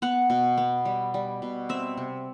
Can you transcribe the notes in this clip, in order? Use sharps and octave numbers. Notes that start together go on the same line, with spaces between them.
B3 F#5
B2
B3
G3
G3
B2
C4 E5
C3